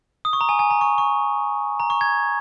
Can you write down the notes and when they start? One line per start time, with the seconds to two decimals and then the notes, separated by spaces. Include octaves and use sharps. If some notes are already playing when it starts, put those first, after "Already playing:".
0.25 D#6
0.33 C#6
0.41 A#5
0.49 G#5
0.59 G#5
0.71 A#5
0.81 C#6
0.98 C#6
1.80 A#5
1.90 C#6
2.01 G#6